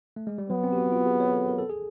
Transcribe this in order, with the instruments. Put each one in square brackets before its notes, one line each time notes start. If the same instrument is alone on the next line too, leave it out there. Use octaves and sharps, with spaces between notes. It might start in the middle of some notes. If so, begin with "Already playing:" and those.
[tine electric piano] A3
G#3
G3
[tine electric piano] F#3 [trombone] B3
[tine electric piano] C4
G4
F#4
F4
G#4
C#5
A4
A#4
A4
G#4